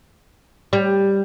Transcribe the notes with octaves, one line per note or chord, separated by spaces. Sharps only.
G3